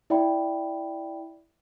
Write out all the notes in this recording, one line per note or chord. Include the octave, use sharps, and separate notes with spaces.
E4 D5 E5 G5 B5